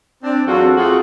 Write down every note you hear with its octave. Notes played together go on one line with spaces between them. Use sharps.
C4 D4
E2 F#3 C4 F4 F#4 A4
A3 C4 F4 F#4 G#4